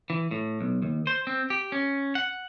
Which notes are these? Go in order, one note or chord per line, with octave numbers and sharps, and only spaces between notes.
E3
A2
B1
D#2
C5
C4
G4
C#4
F#5